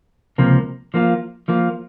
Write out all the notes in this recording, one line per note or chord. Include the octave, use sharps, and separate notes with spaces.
C#2 C3 F3 A#3
F3 A#3 F4
F3 A#3 F4